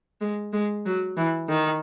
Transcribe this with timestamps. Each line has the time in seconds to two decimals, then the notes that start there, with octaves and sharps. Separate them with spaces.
0.21 G#3
0.53 G#3
0.86 F#3
1.17 E3
1.49 D#3